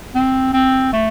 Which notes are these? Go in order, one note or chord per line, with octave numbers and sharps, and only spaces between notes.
C4
C4
A3